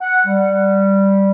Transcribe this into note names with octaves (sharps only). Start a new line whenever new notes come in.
F#5
G3